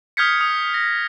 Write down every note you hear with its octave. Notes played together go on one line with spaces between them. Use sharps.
D#6 F6 G6 G#6 B6 C#7
D#6
A#6